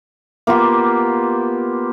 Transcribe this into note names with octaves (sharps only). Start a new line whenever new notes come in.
A#3 B3 F4 G4